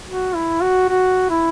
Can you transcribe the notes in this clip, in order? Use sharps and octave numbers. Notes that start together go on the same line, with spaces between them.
F#4
E4
F#4
F#4
E4